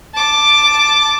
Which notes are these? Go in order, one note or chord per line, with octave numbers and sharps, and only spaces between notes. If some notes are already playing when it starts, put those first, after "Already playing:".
A5 D6